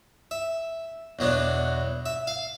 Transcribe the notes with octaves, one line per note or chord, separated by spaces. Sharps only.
E5
E2 B2 F#3 B3 D4
E5
F5